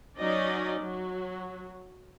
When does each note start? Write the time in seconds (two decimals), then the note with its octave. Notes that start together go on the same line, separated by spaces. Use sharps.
0.18 F#3 C#4 D#4 D5 D#5
0.80 F#3